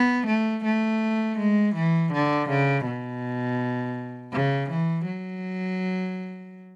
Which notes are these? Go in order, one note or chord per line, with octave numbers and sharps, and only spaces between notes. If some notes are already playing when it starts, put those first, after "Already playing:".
Already playing: B3
A3
A3
G#3
E3
D3
C#3
B2
C#3
E3
F#3